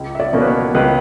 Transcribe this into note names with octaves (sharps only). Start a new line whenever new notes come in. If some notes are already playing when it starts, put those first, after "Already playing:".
Already playing: C#2
E5
D5
B2 A#3 C#4
B4
C#5
C#2 B4